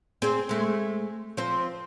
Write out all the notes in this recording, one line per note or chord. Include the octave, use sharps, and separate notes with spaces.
C4 G#4 C5
G#3 A3
F3 C4